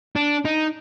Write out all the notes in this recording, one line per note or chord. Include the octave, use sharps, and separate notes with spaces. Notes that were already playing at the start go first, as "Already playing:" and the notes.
D4
D#4